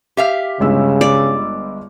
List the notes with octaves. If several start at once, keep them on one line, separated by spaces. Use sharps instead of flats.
G4 E5 F5
G1 C#3 G#3 E6
D5